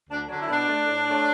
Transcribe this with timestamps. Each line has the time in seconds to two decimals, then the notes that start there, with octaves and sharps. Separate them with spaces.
0.09 D2 D4
0.28 D3 F#3 D4
0.39 E4
0.49 B2 D4
0.68 A3
0.87 A2
1.07 F#3 A3